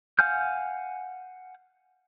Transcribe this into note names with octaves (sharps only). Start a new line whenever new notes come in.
F5 F#5 G#5 F6 G6